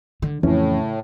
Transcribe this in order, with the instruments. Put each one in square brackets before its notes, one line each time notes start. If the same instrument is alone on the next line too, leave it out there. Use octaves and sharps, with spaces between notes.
[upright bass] D3
[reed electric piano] F2 E3 C#4 [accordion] A2 [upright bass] C#3